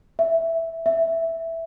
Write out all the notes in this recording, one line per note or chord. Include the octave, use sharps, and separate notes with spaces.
E5
E5